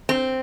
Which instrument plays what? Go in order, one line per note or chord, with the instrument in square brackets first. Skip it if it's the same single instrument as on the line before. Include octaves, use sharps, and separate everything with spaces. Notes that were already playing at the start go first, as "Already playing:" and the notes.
[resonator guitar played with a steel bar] C4